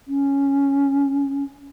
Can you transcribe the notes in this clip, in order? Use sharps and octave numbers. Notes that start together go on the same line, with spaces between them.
C#4